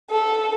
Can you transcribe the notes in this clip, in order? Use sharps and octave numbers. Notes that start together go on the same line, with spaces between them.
A4